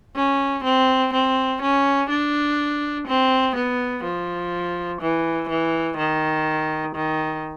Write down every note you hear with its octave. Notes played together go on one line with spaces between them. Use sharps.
C#4
C4
C4
C#4
D4
C4
B3
F3
E3
E3
D#3
D#3